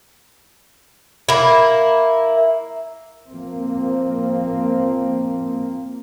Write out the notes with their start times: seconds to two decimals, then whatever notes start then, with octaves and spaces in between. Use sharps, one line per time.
1.29 A#3 E4
3.31 F3 A#3 C4